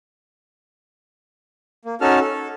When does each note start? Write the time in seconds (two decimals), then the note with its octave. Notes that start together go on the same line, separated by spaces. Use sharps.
1.85 A#3
2.01 C#4 D#4 F#4 A4 A5 F6
2.20 A4